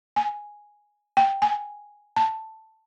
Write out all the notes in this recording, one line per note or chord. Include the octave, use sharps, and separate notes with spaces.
G#5
G5
G#5
A5